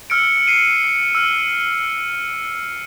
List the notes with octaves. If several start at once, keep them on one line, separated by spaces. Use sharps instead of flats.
E6 F6 C#7 D7
C7 D#7
E6 F6